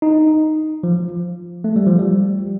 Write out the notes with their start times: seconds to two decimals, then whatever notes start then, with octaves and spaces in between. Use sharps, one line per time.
0.02 D#4
0.83 F3
1.64 A3
1.76 G3
1.87 F3
1.99 G3